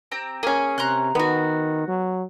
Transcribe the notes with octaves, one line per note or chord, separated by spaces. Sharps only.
C4 G4 A#5
A#3 C#4 G#4
C3 A#5 C6 F#6
D#3 B3 F#4
F#3